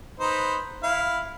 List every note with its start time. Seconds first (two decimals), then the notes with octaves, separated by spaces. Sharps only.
0.20 D#4 B4 C5
0.83 E4 F5